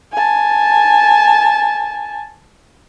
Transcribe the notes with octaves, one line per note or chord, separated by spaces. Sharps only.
G#5 A5